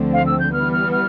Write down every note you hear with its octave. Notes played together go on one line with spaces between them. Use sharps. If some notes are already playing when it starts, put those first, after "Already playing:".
Already playing: D2 D3 F3 A3 C4
F5
E6
G6
E3 G3 B3 F6
F6
F6